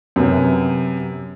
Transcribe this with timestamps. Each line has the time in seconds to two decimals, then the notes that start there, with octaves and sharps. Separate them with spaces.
0.16 F#2 C3 B3